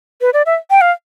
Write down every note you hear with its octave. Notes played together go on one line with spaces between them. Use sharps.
B4
D5
E5
G5
F5